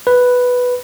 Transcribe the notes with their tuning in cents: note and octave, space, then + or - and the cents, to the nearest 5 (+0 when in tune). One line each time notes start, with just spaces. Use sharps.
B4 +0